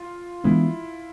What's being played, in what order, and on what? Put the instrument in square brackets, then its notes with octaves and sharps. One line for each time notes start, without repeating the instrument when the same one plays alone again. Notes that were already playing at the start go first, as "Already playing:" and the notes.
Already playing: [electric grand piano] F4
[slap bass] E3 G#3 B3 D4 [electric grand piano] E4